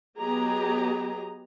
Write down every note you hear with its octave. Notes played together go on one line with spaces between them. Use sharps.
F#3 B3 G4 G#4 D#5 A#5